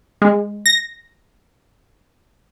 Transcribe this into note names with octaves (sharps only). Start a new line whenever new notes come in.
G#3
A#6